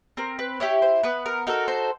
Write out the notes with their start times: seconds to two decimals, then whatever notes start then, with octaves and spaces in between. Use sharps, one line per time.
0.17 C4 A#4
0.39 B4
0.60 E4 G4 C#5
0.82 C5
1.03 B3 B4
1.26 A#4
1.47 D#4 F#4 A4 A#4
1.68 C5